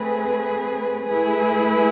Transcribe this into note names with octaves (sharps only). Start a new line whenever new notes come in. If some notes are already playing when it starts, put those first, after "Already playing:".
Already playing: A3 C4 G#4 B4
A3 E4 G#4 B4